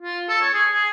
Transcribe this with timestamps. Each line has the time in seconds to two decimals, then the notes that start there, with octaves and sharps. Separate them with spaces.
0.02 F4
0.29 A4
0.41 C#5
0.54 G#4
0.72 G#4